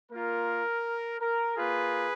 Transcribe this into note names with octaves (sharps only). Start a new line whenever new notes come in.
A#3 F4 A#4
A#4
A#3 F4 G#4 B4